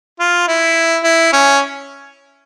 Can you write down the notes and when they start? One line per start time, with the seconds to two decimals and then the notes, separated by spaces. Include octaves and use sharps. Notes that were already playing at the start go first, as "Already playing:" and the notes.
0.20 F4
0.48 E4
1.04 E4
1.33 C#4